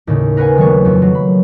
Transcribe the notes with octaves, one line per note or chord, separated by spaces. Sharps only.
D#2 A2 C#3
A#4 B4 F5 F#5 G#5
D#3 F#3 A3 B3 C#5
F2
F#3
B5